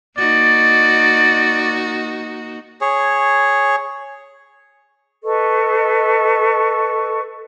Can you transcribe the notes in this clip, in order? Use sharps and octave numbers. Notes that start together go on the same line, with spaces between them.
A#3 D#4 F#4 D5
G#4 C#5
A4 B4 D#5 C#6